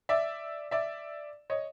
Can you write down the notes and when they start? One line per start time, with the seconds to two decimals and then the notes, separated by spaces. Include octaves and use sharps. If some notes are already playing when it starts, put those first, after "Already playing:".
0.09 D5 E5
0.71 D5 E5
1.50 C#5 D#5